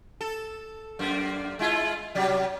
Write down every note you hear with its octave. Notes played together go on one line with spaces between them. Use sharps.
A4
F#2 A#3
G#3 E4 F4
C3 F#3 G3